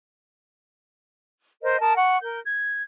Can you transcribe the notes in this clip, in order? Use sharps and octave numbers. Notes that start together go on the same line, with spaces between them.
A#4 C5 D#5
A#4 A5 D#6
F#5 C#6
A#4 G6
G#6